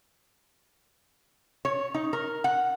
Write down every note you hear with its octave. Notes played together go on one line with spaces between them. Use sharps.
C#5
D#4
A#4
F#5